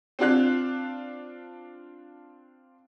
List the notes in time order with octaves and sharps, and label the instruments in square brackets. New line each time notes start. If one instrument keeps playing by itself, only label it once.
[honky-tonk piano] C4 D4 F4 F#6